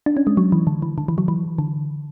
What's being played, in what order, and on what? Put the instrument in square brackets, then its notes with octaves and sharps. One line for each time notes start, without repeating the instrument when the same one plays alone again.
[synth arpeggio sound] D4
C#4
G#3
F#3
E3
D3
E3
D3
E3
F#3
E3
D3